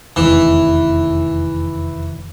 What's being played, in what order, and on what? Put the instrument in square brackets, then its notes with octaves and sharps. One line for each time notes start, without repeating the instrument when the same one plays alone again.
[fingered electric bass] F1 E2 D#3 [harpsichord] E3